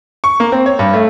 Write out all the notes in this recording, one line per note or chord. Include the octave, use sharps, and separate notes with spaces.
C#6
A#3
C4
C#5
G2
A3